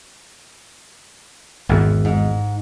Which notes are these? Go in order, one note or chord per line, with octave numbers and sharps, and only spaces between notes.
G#1 E2
G#2